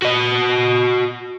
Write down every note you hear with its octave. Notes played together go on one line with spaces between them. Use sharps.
F#4 D#5